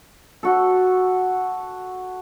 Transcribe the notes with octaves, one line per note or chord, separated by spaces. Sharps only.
F#4 A4